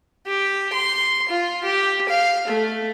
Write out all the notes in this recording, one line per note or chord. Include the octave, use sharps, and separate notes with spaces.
G4
C6
F4
G4
F5
A3